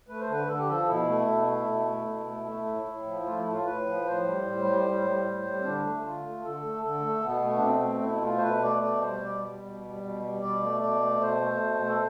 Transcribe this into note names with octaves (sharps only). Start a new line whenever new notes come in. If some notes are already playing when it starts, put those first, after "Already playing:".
A3 B4
C5
D3 B4
D3 A4
G4
F3 A4
B2 E4
A3
B2
A3
B2
A3
B2
A3
A3
A2
A2
F3
A3 F4
E4
A2
F4
A2 B4
F3
A2 C5
G3
A2
G3
A2
G3
A2
G3
C4
D3 D4
A3
D3 F4
A3
D3 A4
A3
D3 A4
A3
B2 B3
A3
D4
B2 C4
A3
B2 E4
A3 F4
C5
B2 B4
A3 D5
B2 D5
G3 C5
B2 D5
G3
B2
G3
B2
G3
B2 D5
A3
B2 D5
A3
B2 C5
A3
B2
A3
A4